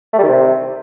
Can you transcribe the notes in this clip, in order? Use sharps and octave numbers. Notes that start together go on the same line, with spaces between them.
A3
G3
D#3
C3